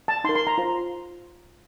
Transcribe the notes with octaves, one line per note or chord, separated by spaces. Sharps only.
A5
D#4 A#4 C6
C6
A#5
F4 C5